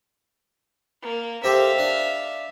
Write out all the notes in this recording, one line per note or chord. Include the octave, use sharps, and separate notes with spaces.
A#3
C4 G4 A4 E5 F5
D4